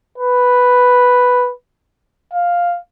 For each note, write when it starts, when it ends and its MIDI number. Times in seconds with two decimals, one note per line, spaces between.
0.18 1.51 71
2.33 2.78 77